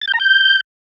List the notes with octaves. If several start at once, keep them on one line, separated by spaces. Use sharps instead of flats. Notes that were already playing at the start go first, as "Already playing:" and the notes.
A6
G6
A#5
G6